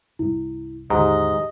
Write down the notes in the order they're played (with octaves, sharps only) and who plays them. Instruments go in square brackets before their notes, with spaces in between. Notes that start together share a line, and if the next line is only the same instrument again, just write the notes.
[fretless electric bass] C2 G2 [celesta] E4
[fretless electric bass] D#2 D3 [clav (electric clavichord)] G#2 [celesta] G4 A#5 [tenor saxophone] D#5